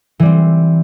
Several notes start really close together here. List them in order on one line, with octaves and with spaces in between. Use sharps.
E3 G3 C4